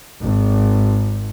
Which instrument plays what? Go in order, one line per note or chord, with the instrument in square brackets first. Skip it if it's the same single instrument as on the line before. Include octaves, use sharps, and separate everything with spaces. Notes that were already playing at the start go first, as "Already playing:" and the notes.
[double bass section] G#1